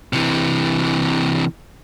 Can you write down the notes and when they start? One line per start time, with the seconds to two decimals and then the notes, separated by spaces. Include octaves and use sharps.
0.13 C3 E3